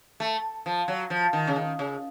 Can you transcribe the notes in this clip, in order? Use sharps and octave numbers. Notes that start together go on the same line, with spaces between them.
A3
F3
F#3
F3
D#3
C#3
D#3
C#3